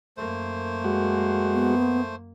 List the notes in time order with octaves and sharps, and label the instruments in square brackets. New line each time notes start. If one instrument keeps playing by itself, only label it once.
[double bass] F#2 A#3 [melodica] A3 C5
[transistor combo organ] G#3 F#4
[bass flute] B3